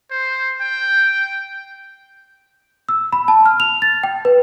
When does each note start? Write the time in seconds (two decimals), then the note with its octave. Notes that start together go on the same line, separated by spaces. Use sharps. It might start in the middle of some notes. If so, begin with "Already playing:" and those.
0.11 C5
0.61 G5
2.89 E6
3.13 B5
3.28 A5
3.46 F6
3.60 F7
3.82 A6
4.03 G5
4.25 B4